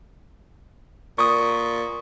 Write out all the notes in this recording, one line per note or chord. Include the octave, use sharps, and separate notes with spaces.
A#2 C#6 D#6